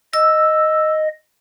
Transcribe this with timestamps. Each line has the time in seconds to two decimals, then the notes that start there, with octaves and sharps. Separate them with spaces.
0.13 D#5 E6